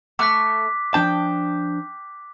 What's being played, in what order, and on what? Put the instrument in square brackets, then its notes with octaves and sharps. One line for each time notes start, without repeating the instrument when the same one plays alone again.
[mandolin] A3 C#6 [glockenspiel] D6 F#6 B6
[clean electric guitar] F3 D4 A5 [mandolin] G5